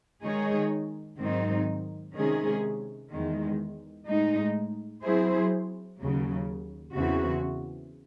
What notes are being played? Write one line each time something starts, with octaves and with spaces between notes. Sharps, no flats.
D#3 G#3 D#4 G#4 C#5
G#2 D#3 F#3 C4 D#4
C3 D#3 G#3 C#4 G#4
E2 D#3 G#3
A2 G#3 D#4
F#3 C4 E4 G#4 C5
D#2 C#3 F#3
E2 C#3 E3 C4 F#4